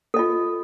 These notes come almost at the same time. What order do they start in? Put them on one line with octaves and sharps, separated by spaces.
A4 D#5 F4